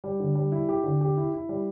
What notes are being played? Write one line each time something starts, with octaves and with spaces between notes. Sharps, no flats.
G3
D3
G3
E4
G4
D3
G4
E4
E4
G3